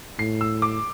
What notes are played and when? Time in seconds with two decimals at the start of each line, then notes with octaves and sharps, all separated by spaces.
0.19 A2 C7
0.41 E6
0.62 D6